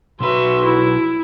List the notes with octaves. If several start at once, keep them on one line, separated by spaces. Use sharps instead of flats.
B1 F#4 B4 E5 C6
E4